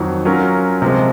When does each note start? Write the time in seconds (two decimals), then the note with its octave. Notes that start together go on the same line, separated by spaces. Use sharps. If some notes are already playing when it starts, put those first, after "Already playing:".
Already playing: F2 D#3 F#3
0.25 F#3 C#4 F4 A#4
0.82 C3 F3 G#3